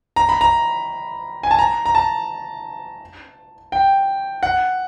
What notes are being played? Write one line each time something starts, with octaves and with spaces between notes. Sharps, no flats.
A#5
B5
A#5
G#5
A5
A#5
A#5
A5
G5
F#5